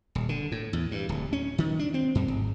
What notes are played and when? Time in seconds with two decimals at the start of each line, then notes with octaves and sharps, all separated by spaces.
0.15 D#1
0.29 D3
0.52 A2
0.73 E2
0.91 G2
1.09 D1
1.33 C#4
1.58 D#3
1.79 D4
1.94 C4
2.15 F#2
2.28 G#1